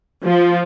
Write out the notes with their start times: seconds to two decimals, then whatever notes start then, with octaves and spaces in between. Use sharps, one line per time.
0.23 F3